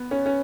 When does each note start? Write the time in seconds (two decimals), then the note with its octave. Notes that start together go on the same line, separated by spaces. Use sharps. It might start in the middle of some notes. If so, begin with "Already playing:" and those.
Already playing: B3
0.11 C#4
0.26 C#4